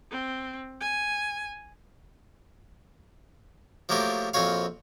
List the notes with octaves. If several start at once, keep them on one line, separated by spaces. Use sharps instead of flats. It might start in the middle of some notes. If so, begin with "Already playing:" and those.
C4
G#5
F3 F#3 A3 A#3 G4 A#4
A#1 F2 C4 F#4 C#5 F5